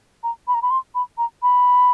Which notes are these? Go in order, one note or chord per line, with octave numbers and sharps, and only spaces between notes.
A#5
B5
A#5
B5
C6
B5
A#5
B5